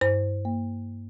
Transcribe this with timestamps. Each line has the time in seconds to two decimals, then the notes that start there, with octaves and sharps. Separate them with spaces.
0.01 G2 C5
0.45 A#3